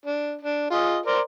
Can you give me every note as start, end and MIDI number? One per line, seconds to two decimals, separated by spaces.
0.06 0.36 62
0.42 0.71 62
0.71 0.99 65
0.71 0.99 68
0.71 0.99 75
1.06 1.20 70
1.06 1.20 72
1.06 1.20 74